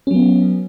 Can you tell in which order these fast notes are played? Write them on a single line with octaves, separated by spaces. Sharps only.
C#4 F#3 B3